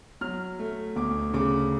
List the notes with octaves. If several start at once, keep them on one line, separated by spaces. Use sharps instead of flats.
F#3 F6
A3
D2 D6
C#3 D6